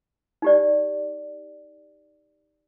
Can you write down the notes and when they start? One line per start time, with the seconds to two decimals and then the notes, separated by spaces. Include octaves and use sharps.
0.42 D#4 G4 D5